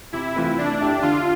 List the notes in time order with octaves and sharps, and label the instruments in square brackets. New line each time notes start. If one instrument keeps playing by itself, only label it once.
[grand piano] C3 [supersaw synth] E4
[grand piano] E3 A3 C4 F4
[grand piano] A3 [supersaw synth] D4
[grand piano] E4 G4 D5
[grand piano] D3 [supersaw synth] F4